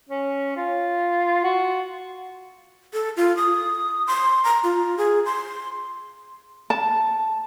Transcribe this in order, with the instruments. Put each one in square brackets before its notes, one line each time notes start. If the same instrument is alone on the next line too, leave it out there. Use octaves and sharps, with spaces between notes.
[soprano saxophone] C#4
F4
F#4
[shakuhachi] A4
F4
D#6
C6
A#5
F4
G#4
C6
[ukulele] A5